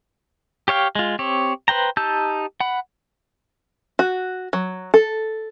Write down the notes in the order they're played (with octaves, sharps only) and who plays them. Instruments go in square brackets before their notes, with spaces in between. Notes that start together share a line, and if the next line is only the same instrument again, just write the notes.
[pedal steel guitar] G4 C#5 F5 G5
G#3 F4
C4 G4 C#5
B4 C5 G5 A#5
D#4 G4 A5 E6 G6
F#5 B5
[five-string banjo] F#4
F#3
A4